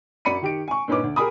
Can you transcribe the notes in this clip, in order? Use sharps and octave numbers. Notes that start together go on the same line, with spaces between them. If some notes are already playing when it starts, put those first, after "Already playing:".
F#2 F#4 D5 B5 C#7 D#7
D#3 G4 D7
G#5 C#6
G2 A#2 C#4 D#4 B4 D6
D2
G4 G#4 A#4 G#5 B5 D#6